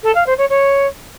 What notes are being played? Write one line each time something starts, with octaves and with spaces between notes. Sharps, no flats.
A4
F5
C5
C#5
C#5